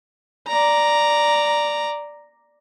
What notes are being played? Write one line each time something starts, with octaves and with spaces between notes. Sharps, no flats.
D5 A#5